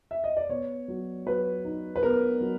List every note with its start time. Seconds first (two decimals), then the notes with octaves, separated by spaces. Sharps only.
0.11 E5
0.24 D#5
0.37 D5
0.49 B3 C#5
0.88 F#3
1.26 F#3 B4
1.65 D#4
1.96 B4
2.03 B3 A#4
2.41 F#3